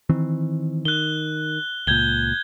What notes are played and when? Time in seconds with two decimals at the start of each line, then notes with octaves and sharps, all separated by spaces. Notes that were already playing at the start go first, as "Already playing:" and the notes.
0.09 D#3 E3 C4
0.85 D#3 F#6 G7
1.87 C#2 A#2 G6 G#6 G7